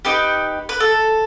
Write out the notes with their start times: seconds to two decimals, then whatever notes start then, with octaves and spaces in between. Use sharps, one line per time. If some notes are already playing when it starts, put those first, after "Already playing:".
0.05 D#4 G4 B4
0.69 B4
0.80 A4